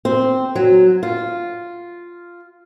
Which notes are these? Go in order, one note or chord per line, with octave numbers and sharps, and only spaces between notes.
C4
F#3
F4